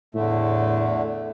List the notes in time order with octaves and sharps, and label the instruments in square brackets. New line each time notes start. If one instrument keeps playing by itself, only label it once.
[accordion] E2 D3 A3 [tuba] A2